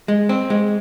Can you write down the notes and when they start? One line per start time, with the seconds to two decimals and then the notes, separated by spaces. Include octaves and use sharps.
0.08 G#3
0.29 C4
0.50 G#3